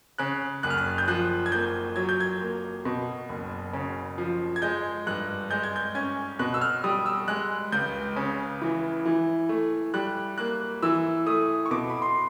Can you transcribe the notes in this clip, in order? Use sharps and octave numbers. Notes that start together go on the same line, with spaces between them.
C#3 F#6
F#1 F#6
F6
F#6
G6
F3 F#6
G#6
A#3 G6
F#3 G#6
G6
G#6
A#3
B2
F#1
C#3
F3
G#6
G#3 G6
G2 F#6
G#3 G6
G#6
G6
C#4 G#6
B2 F#6
E6
F6
G3 D#6
E6
G#3 F#6
C#2 G6
C#3
E3
E3
A3
G3 F#6
A#3 F#6
E3 E6
A3 D#6
C#6
B2 D6
B5
C6